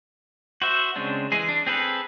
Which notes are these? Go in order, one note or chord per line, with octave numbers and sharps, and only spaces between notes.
F#4 C5 E5
C#3 G#3 C4 D4
E3 G#3 G#4
D4
C4 G#4 A4 B4